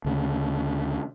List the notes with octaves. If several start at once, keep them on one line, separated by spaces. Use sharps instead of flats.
D2 C#3